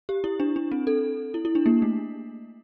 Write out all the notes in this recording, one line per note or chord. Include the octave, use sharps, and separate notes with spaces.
G4
E4
D4
D4
C4
A4
E4
E4
D4
A#3
A3